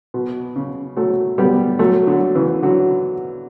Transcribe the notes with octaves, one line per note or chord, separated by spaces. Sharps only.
B2
C#3
F#3 A3
G3 B3
F#3 A3
D3 F#3
C#3 E3
D3 F#3